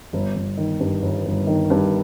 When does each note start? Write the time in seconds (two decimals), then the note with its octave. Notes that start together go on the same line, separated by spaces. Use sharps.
0.13 G1
0.35 G1
0.57 D#3
0.80 G2
1.02 G1
1.25 G1
1.47 D#3
1.70 G2